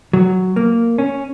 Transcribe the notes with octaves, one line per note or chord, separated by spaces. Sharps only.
F#3
A#3
C#4